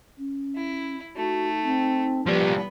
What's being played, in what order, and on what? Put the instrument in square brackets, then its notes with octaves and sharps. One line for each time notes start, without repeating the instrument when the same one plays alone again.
[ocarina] C#4
[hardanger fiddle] E4
[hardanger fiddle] A3 [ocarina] D#4 [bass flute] F#4
[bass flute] C4
[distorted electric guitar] F3 D5 [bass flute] G3 [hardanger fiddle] B3 B4 [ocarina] G4